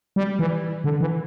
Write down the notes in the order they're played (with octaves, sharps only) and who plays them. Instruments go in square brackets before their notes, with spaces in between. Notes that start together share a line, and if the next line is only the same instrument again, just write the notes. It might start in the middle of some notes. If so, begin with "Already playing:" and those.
[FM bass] G3
E3
D3
E3